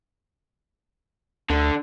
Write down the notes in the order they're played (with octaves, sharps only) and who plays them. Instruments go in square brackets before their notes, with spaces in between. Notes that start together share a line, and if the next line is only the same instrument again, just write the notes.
[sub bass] D2 [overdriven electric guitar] D3